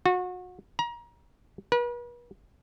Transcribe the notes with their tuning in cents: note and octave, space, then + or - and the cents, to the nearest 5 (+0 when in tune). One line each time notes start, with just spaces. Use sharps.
F#4 -30
A#5 +30
B4 -40